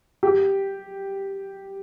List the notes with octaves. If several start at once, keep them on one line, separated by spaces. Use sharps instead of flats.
G4